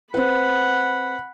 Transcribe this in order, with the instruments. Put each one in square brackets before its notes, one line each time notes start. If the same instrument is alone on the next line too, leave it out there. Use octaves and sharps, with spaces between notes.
[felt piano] C4 B4 [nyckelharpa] F#5 B5